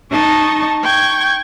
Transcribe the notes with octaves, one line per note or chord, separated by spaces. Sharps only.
D#4 D#5 A5 C#6
G5 C#6 G#6